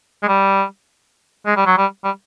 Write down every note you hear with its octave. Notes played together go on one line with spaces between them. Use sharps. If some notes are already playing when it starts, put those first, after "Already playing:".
G#3
G3
G#3
G3
F#3
G3
G3